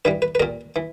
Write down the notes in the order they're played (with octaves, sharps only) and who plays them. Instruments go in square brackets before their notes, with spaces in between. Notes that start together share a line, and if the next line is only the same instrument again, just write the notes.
[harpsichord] G2 E3 G3 B4
B4
B4
A#2 G3 A#4
E3